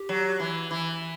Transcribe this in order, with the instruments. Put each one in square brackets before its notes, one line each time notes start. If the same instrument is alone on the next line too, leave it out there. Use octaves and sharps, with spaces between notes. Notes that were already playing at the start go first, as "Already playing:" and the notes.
Already playing: [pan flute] G4
[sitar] F#3
E3
E3